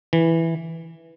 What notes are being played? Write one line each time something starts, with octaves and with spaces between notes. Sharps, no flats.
E3